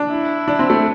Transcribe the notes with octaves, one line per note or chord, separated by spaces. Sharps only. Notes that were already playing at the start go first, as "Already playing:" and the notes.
Already playing: D4
E4
D4
C4
A3